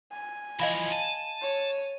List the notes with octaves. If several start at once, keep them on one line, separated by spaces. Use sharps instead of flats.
G#5
E3 F3 D#5 F5 B5
A5 D#7
C#5